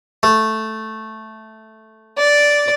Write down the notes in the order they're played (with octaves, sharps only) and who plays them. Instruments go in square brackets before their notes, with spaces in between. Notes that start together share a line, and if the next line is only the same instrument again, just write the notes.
[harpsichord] A3
[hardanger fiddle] D5